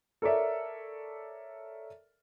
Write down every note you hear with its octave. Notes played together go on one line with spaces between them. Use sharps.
A4 A#4 C#5 D5 E5